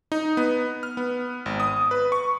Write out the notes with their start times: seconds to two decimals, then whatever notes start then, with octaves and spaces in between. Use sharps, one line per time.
0.12 D#4
0.37 B3
0.83 F6
0.97 B3
1.46 G#1
1.60 D#6
1.91 B4
2.12 C#6